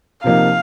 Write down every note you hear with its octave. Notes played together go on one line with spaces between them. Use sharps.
C3 F3 A#3 D#4 F5